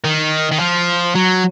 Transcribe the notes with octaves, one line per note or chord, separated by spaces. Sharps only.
D#3
D#3
F3
F#3